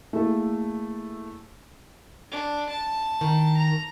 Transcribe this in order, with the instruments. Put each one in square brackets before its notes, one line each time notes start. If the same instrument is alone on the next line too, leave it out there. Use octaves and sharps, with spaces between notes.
[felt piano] A3 A#3 E4 G#4 A4
[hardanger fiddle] D4
A5
[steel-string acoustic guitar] D#3
[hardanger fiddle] A#5